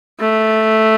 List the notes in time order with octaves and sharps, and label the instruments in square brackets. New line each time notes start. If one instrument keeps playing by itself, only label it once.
[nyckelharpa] A3